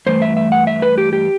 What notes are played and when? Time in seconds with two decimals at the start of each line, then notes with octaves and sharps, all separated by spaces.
0.06 G2 E3 A3 C5
0.22 E5
0.37 E5
0.52 F#5
0.67 E5
0.82 B4
0.98 G4
1.13 G4